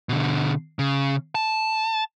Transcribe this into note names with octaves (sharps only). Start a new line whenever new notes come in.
B2 D3
C#3
A5